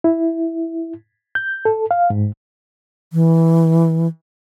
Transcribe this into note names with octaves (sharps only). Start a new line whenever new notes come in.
E4
G6
A4
F5
G#2
E3